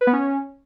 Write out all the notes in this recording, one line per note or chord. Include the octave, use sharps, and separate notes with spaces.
B4
B3
C#4